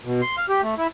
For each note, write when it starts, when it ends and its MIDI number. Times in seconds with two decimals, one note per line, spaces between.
0.05 0.21 47
0.22 0.36 84
0.37 0.46 77
0.49 0.62 67
0.63 0.75 57
0.78 0.87 64